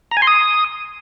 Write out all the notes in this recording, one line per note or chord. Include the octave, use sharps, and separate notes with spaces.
A#5
G#5
C6
D#6